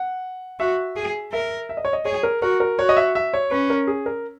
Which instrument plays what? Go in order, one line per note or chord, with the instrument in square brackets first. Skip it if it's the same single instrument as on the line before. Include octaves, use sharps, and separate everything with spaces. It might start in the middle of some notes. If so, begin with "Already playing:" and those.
Already playing: [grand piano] F#5
[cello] F#4 [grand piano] E5
[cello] G#4
[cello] A#4 [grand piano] E5
[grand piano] E5
D#5
C#5
D#5
[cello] G#4 [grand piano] C#5
[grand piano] A#4
[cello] F#4 [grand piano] A#4
[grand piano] A#4
[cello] F#4 [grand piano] C#5
[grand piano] D#5
E5
E5
C#5
[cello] C#4 [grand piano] B4
[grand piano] A#4
G#4
A#4